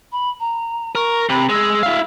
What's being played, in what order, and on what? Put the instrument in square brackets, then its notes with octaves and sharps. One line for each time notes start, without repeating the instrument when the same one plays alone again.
[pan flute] B5
A#5
[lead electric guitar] A#4 [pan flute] C#6
[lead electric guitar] C3 [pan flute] B5
[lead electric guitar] G#3 [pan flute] E6
[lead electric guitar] E4 F5